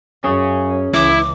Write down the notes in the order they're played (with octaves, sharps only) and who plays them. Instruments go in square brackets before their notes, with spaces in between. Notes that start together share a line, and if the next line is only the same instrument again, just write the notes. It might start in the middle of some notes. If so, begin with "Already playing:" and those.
[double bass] F#2 [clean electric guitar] C#4 G#4
[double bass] C#2 E3 [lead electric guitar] E4 [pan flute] D6